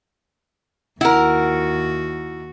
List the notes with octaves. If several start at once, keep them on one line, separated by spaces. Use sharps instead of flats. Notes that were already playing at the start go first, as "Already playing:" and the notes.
D#2 E4 F#4 A#4 F#5